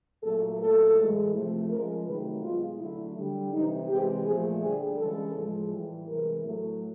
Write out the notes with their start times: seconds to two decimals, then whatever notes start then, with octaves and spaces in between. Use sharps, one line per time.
0.24 A#2 F#3 A3 A4
0.60 A#2 F#3 A3 A4
0.97 A2 E3 G#3
1.34 C3 F3 A3
1.69 C#3 F3 G#3 A#4
2.06 C3 D#3 F#3 A3 B4
2.42 B2 G#3 F4
2.79 D3 F#3 A3 E4
3.16 D3 G3
3.52 C3 E3 G3 D#4
3.89 C3 E3 G#3 G4
4.25 A#2 F3 A3 G#4
4.62 D3 G3 G#4
4.98 C#3 E3 G#3 A4
5.35 A2 F3 G#3
5.71 A2 E3 G3
6.08 C3 E3 G#3 A#4
6.44 A2 F#3 A3